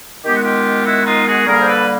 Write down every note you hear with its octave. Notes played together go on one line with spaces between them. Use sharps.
D#3 G#3 B3 G4
F#4
F4 G4
E4 F#4
D#4 F4
F#4 G#4
D3 G3 A#3 G#4 A#4
C5
A4 B4